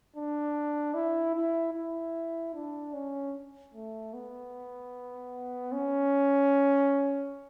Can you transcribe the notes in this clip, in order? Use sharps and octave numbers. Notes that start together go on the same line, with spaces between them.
D4
E4
E4
E4
D4
C#4
A3
B3
C#4